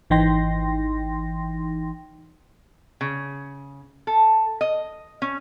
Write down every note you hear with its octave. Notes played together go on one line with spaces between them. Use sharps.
G#1 E3 D#4 G5 C6 A#6
C#3
A4
D#5
C#4